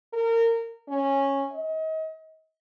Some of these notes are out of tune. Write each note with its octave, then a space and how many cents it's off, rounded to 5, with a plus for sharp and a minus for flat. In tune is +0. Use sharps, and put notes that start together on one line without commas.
A#4 -25
C#4 -10
D#5 +35